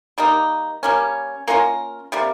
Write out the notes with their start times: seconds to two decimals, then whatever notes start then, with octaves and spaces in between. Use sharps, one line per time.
0.18 G3 A#3 D#4
0.83 G3 A#3 C#4
1.48 A#3 C#4 F4 A#4
2.12 C3 G3 A#3